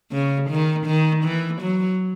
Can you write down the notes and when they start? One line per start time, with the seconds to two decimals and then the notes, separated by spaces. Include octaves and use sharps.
0.12 C#3
0.50 D#3
0.86 D#3
1.24 E3
1.62 F#3